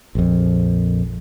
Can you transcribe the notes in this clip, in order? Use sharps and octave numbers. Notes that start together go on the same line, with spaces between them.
A#1 F2